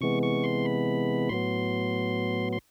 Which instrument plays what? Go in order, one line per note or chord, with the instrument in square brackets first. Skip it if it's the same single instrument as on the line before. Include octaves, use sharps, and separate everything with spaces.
[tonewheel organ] C3 E3 G#3 B3 C#6
C#6
C6
B5
A2 F#3 B3 C6
C6